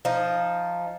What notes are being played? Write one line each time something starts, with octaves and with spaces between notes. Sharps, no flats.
F3 D#4